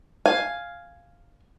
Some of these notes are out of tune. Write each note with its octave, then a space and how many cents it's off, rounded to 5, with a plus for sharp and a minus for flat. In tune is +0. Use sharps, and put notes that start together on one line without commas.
F5 +0 G#5 +0